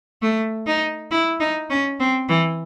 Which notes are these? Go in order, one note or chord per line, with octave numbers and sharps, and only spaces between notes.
A3
D#4
E4
D#4
C#4
C4
E3